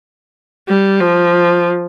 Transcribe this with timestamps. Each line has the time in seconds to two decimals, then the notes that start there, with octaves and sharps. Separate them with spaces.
0.68 G3
1.01 F3